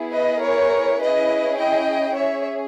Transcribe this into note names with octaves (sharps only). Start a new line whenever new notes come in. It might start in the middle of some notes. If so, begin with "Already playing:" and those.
Already playing: B3 E4 G#4
B4 D#5
A#4 C#5
C#4 E4 G#4 B4 D#5
D#5 G5
C#4 G#4 C#5 E5